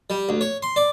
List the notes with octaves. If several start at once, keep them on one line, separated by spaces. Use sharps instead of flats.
G3
D2
C#5
C6
D5